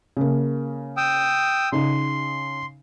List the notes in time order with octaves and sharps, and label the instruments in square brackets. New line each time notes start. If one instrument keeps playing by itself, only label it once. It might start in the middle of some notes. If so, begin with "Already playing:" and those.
[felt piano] C#3 A#3
[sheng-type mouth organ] G5 D#6 E6
[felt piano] C#3 D#4 [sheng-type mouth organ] C6